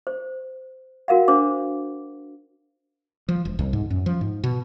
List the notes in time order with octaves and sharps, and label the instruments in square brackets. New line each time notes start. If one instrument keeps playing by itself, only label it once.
[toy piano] C5
F#4 A#4 F5 F#5
D4 C5 D6
[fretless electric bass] F3
E1
C2
G#2
F#2
F3
G#2
B2